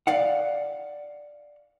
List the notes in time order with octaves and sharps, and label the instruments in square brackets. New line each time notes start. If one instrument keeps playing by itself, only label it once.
[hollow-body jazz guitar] D5 F5 F#5